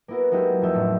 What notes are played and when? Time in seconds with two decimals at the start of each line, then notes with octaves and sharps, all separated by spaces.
0.08 A#3 B3 E4 F#4 A#4
0.31 F#3 G#3 D#4 E4 F#4 G4
0.61 F2 F#3 A3 D#4 E5 G6
0.74 A1